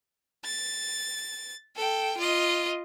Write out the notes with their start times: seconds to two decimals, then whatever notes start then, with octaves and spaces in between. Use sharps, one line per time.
0.45 A6
1.76 A4 G5
2.17 F4 D#5